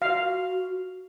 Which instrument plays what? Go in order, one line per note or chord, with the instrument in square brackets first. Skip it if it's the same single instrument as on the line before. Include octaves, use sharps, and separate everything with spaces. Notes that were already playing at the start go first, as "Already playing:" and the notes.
[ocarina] F#4 [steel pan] F5